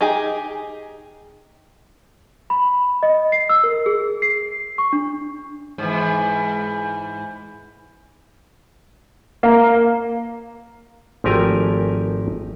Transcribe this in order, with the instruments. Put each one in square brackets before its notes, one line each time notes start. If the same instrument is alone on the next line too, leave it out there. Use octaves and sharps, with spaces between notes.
[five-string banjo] D#4 G4 G#4
[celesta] B5
D#5
C7
E6
A#4
G#4
C7
C#6
D4
[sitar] G#2 E3
[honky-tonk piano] A#3
[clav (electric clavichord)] G#1 F3 A3 G4 A#4 G#5